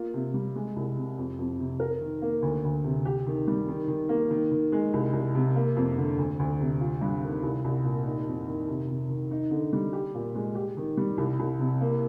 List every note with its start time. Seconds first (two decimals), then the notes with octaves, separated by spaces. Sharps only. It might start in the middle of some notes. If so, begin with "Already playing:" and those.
Already playing: A#3 F4
0.14 C3
0.34 G3
0.56 G#3
0.76 C2
0.96 C3
1.18 F2
1.39 F2
1.59 C3
1.80 A#4
2.01 D#3
2.22 A#3
2.42 D2
2.64 D2
2.84 C3
3.05 G4
3.27 D#3
3.47 G3
3.68 D#3
3.88 D#3
4.09 A#3
4.31 D#3
4.51 D#3
4.72 G#3
4.93 C2
5.13 C2
5.35 C3
5.55 A#3
5.76 F2
5.97 D3
6.17 D2
6.39 D2
6.60 C3
6.80 F4
7.01 G2
7.23 D#3
7.43 C2
7.64 C2
7.84 A#2
8.05 D#4
8.26 F2
8.47 D#3
8.68 C3
8.88 C3
9.09 D#3
9.31 D#4
9.51 D3
9.73 G3
9.93 G4
10.14 A#2
10.35 G#3
10.55 G4
10.77 D#3
10.97 G3
11.17 C2
11.39 C2
11.59 C3
11.81 A#3